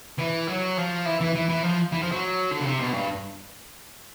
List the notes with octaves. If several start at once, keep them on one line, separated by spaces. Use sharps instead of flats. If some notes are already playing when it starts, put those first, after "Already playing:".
E3
F#3
F3
E3
E3
E3
E3
F3
E3
F3
F#3
D3
C#3
C3
B2
G2